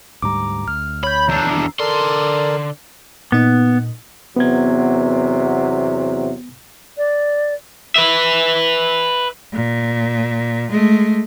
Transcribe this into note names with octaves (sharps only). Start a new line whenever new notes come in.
D2 G#2 G3 A#5 D6
D2 F6
C#5 B5 G6
E2 D4 A#5 E6 C7
D3 A4 A#4 D5 C6
A#2 B3 D#4
E2 C3 F#3 B3 G#6
D5
B4 E5
A#2
G#3 A3